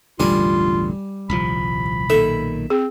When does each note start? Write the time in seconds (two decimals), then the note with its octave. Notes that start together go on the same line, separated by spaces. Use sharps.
0.20 E1 A1 D3 G3 F4 G#5
1.30 D#1 C2 F3 B5
2.10 B1 A#2 D#3 A4 E5
2.70 C4 G#4